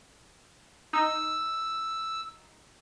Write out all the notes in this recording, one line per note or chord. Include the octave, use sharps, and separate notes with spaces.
D#4 E6